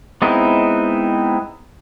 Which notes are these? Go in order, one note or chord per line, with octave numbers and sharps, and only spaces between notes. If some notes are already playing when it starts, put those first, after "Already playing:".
G#3 B3 C4 D#4 E4